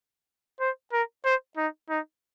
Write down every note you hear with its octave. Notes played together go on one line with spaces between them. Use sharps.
C5
A#4
C5
D#4
D#4